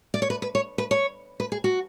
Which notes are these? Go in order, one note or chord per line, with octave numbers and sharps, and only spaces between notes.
D5
C#5
B4
B4
C#5
B4
C#5
B4
G#4
F#4